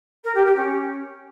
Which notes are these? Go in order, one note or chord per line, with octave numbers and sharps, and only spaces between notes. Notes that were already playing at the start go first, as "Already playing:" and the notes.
A#4
G4
G4
C#4